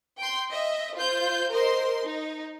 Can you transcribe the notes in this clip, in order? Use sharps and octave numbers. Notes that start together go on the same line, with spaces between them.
G5 C6
D#5 E5
F4 C5 G6
A#4 C5 D#5 C6
D#4